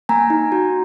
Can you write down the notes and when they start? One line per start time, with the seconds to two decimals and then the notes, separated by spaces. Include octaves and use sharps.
0.09 A#3 G#5 A#5
0.30 D#4
0.52 F#4